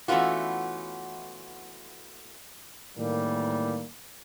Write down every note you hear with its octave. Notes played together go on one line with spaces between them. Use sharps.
E3 A3 B3 C#4 F4 F#4
A2 D#3 E3 G3 A#3